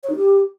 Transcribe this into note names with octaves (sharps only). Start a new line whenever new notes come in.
C#5
D#4
G4